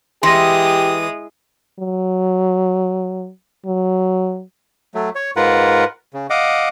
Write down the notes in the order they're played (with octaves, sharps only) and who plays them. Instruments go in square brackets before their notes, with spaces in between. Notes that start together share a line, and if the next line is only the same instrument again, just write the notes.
[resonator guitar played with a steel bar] E3 [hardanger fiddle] G#3 D#6 [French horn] G4 [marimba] C6 A#6
[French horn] F#3
F#3
[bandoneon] F#3 A3
C#5
G#2 F4 A#4 B4 F#5
C#3
D#5 F5 F#5 D6